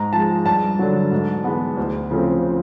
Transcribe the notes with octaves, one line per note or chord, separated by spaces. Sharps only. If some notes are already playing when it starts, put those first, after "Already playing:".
Already playing: G#2 A#5
F3 G#3 A5
G2 A5
D3 F#3
G#2
E3 G#3 B3
D2
C#3 F3 A3 C4